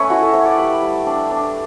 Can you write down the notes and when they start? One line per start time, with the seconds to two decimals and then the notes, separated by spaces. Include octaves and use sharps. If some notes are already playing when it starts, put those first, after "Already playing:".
Already playing: A3 C#4 B4 C#5
0.10 E4 F#4
0.22 A4
0.33 A3 C#5
0.45 D5
0.58 G3 B5
0.82 G3
1.07 D4
1.31 D4